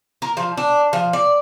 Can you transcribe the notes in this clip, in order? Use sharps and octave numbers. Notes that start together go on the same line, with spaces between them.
A#4
F3
D4
F3
D5